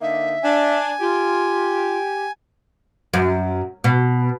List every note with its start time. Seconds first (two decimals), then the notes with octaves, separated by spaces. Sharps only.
0.01 D3 A#3 D#4 E5
0.43 D4 G#5
1.00 F4 G4
3.13 F#2
3.84 B2